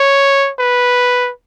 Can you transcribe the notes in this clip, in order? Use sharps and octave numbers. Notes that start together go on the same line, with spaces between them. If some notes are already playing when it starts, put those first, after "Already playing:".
Already playing: C#5
B4